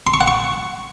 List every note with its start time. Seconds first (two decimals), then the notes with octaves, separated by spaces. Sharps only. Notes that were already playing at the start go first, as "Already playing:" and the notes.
0.07 C6
0.14 C#6
0.21 F#5
0.28 C#6